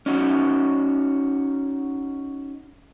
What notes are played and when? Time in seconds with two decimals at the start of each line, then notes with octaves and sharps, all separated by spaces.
0.06 C#4 D#4 F#4